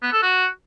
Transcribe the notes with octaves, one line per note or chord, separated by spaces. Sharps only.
B3
A4
F#4